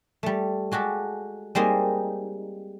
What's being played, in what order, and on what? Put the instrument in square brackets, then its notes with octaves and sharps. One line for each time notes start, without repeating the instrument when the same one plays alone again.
[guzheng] G3 A3
G#3 F#4 G4 A4
G3 G#3 A#3 C4 D#4